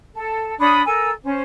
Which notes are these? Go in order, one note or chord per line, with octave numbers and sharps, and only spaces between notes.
A4
D4 C#5 B5 D#6
A4 A#4 G#5 E6
C#4 C5